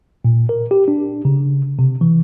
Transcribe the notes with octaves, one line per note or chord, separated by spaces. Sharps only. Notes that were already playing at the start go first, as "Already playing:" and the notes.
A#2
A#4
G4
D4
C#3
C3
E3